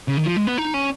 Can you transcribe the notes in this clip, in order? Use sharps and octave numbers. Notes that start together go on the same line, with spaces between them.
C#3
D#3
F3
G#3
B3
D#4
C#4